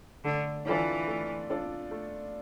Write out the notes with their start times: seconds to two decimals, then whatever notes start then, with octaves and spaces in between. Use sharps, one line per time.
0.24 D3 A3
0.66 E3 D4 F4 A4 D5
1.07 A3
1.50 D4 F4 A4 D5
1.91 A3